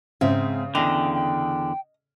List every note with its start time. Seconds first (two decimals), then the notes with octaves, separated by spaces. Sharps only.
0.21 G#2 C#3 C4 E5
0.75 E2 D3 D#5 G5
1.14 G5